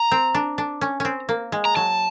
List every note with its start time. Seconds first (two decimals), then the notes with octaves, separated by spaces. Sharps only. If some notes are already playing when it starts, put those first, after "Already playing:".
Already playing: A#5
0.12 C4
0.35 D4
0.58 D4
0.81 C#4
1.00 C4 C#4
1.29 A#3
1.52 G#3
1.65 A#5
1.76 F#3 A5